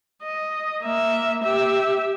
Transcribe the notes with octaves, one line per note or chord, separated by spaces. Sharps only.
D#5
A#3 E5
G4 E5